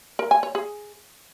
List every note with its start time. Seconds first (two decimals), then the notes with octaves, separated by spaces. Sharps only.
0.19 A#4
0.31 G#5
0.43 C#5
0.55 G#4